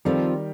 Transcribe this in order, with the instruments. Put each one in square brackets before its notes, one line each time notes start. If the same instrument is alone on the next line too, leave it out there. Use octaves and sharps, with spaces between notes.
[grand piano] D#3 G3 [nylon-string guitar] F3 C4 F4 A4